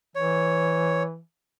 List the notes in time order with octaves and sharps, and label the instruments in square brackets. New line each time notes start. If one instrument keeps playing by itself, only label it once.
[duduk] E3 [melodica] C#5